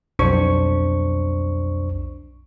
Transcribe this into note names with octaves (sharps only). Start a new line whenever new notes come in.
B1 F2 D4 C5 C#6